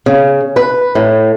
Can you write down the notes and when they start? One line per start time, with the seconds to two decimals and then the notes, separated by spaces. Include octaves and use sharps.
0.06 C#3
0.56 B4
0.95 A2